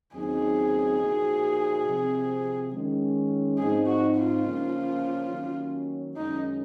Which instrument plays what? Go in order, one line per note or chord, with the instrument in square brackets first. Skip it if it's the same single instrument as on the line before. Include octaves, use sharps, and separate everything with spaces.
[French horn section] D#2 C#3 F#3 C4 D#4 [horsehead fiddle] G#4
[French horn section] A#2 F3 A#3 D#4 F#4
C3 F3 C4
D#3 G#3 C#4
[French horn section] G#2 F3 C4 D#4 [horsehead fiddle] G#4
[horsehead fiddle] F#4
F4
[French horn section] C#3 F3 A#3 C#4
D#3 F#3 A#3 C#4
[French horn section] F#2 D#3 G#3 C#4 [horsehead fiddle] D#4